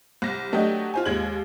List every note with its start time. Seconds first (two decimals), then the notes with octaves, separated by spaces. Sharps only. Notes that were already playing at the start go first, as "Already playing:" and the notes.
0.22 C2 A#6
0.52 F#3 A3 D4 F#4 G4 D#5
0.94 F4 C5 G#5
1.05 D#2 G#3 G#6 F#7